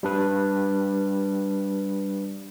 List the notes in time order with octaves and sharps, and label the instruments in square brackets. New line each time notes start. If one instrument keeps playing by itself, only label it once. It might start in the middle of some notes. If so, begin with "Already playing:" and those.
[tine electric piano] G3 D4 B4